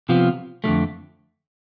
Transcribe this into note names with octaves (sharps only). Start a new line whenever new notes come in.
C3 F3 B3 F4
F2 D3 F3 A3